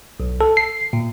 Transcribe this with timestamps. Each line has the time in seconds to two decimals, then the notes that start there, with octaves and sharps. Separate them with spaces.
0.20 B1
0.41 A4
0.57 C7
0.93 A#2